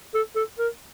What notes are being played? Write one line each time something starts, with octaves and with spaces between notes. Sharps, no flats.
A4
A4
A#4